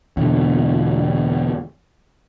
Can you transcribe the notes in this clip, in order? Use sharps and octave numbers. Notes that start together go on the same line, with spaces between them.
E2 B2 D3